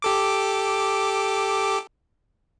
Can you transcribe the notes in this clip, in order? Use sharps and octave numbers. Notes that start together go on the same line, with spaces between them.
G4 A4 D6